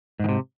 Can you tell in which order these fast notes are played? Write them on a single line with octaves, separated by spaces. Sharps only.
G#2 D#3 C3